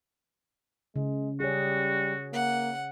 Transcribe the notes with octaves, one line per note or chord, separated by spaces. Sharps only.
C#3 G#3
G3 F#4 G#4 C#5
A#3 F#5